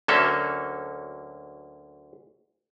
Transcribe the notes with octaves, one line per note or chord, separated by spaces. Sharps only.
D2 D3 F#3 A#3 C#4 A4